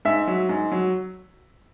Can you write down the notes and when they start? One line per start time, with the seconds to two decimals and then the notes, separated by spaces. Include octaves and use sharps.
0.05 G#2 E5
0.28 F#3
0.49 G#2
0.72 F#3